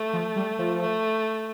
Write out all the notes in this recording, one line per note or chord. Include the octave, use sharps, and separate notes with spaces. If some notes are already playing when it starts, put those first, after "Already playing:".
Already playing: A3
F3
G3
F3
A3